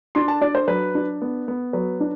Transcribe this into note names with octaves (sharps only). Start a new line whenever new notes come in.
D4 C6
A5
D4 D5
C5
F#3 B4
D4
B3
B3
F#3 B4
D4